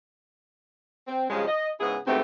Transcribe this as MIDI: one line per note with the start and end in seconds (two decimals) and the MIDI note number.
1.08 1.24 60
1.29 1.47 43
1.29 1.47 49
1.29 1.47 53
1.29 1.47 56
1.47 1.69 75
1.79 1.96 44
1.79 1.96 49
1.79 1.96 59
1.79 1.96 64
1.79 1.96 68
2.07 2.21 38
2.07 2.21 44
2.07 2.21 57
2.07 2.21 59
2.07 2.21 60
2.07 2.21 67